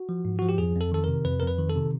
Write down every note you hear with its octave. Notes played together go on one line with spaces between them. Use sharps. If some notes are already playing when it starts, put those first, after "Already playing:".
Already playing: F#4
F3
G#2
F3 F#4
G4
F2 G#4
F2 A4
D#3 A4
C3 A#4
F2 B4
A#4
F2 B4
D#3
A4
C3